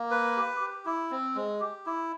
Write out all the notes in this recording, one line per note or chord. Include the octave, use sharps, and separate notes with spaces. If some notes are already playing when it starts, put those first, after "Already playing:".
Already playing: A#3
B4
G4
G4
E4
C4
G#3
G4
E4